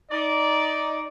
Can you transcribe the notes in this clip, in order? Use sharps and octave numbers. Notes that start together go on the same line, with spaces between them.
D#4 D5